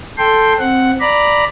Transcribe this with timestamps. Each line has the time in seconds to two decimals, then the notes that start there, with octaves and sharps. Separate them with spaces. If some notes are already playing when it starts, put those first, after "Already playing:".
0.18 A4 G5 C6
0.59 C4 F#5
1.01 D5 A#5 B5